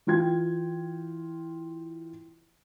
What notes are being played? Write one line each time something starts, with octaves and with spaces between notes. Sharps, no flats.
E3 F4 G5 G#6